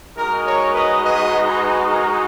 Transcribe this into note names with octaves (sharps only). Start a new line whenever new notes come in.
G#3 D#4 F#4 A#4
A#4 C#5
B4 D#5
B4 D#5
G#4 B4
A#4